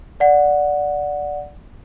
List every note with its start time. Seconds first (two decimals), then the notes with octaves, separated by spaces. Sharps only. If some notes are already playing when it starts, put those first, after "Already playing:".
0.20 D5 F#5